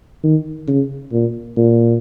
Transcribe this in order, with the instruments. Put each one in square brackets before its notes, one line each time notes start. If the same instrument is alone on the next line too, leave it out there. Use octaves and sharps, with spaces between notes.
[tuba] D#3
C#3
A#2
A#2